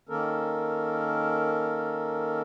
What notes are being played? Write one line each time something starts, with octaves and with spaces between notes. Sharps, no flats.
D#3 A#3 C#4 A4 A#4